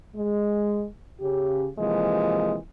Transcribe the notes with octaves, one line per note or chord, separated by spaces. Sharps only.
G#3
C#3 G4
C3 E3 F3 G#3 A#3